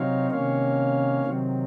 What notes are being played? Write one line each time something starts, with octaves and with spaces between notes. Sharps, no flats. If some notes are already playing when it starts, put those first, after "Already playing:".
Already playing: C3 F#3 C4 D#4 C#5 F5
C3 D#3 A#3 C#4 C#5 F5
C3 D#3 F#3 C4